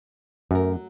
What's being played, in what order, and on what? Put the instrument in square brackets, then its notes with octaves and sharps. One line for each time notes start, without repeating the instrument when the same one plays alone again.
[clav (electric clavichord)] F#2 [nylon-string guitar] A3 A#4
[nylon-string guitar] F#3